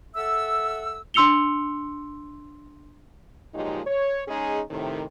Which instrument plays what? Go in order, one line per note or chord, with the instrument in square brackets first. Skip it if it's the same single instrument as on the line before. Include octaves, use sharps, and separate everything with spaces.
[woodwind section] A4 E5 F#5 E6
[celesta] D4 C6 E6 C#7 F7 G7
[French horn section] A#2 F3 F#3 G#3 D#4 G4
C#5
G#3 C#4 D#4 G#4
A2 C3 D#3